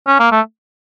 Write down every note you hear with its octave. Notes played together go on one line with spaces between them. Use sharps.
C#4
A#3
A3